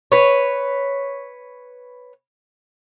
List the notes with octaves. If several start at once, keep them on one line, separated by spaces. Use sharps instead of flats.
B4 C#5